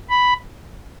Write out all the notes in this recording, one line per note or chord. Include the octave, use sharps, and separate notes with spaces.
B5